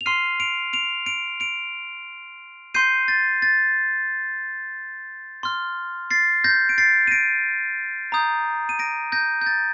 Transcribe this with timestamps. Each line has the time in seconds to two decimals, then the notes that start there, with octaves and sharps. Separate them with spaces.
0.01 F7
0.06 C6 F6 C7 D#7
0.40 D7 F7
0.73 D7 F7
1.06 D7 F7
1.40 D7 F7
2.74 C6 G6 C7 D#7
3.08 A6
3.42 A6
5.43 C6 F6
6.11 A6 C7
6.44 G6 A#6
6.69 D7
6.78 A6 C7
7.07 D#7
7.11 A#6 D7
8.12 A#5 D#6 G6
8.69 D#7
8.79 A#6 D7
9.12 G6 A#6
9.41 G6
9.46 A6